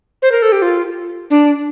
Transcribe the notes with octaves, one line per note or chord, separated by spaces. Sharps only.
C5
A#4
A4
G4
F4
D4